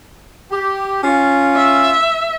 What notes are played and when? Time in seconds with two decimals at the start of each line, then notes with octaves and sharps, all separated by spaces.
0.52 G4
1.04 C#4 F4
1.56 E5